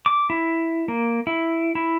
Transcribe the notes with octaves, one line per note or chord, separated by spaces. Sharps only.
D6
E4
A#3
E4
E4